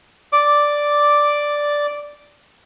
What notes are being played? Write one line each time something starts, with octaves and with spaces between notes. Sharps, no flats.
D5 D6